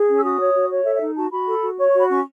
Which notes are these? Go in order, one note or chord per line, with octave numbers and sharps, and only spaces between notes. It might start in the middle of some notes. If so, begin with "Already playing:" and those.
Already playing: G#4
C#4
E6
F#4 D#6
C#5
F#4
C#5
A4 E5
E5
D#4
F#4 A5
F#4 B5
A4
F#4
C#5 C#6
C#6
F#4
B5
C#4 C#6